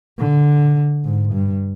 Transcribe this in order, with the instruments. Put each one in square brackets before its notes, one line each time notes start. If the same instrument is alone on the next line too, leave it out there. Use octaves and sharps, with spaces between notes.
[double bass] D3
G#2
G2